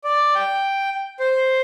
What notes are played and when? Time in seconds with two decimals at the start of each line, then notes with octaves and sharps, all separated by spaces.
0.04 D5
0.35 G5
1.20 C5